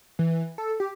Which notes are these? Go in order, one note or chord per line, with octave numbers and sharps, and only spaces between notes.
E3
A4
G4